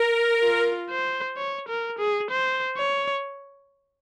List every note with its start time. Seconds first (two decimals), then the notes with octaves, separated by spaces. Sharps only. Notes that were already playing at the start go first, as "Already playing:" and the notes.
Already playing: A#4
0.43 F4
0.90 C5
1.37 C#5
1.68 A#4
1.99 G#4
2.30 C5
2.78 C#5